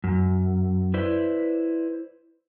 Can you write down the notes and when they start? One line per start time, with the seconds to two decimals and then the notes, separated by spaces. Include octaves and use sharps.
0.04 F#2
0.94 E4 B4 C5 D5